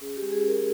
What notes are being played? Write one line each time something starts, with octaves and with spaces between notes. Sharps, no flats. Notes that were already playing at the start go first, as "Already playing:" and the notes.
C#4 G#4
G4
G#3
G#4
C#4 A#4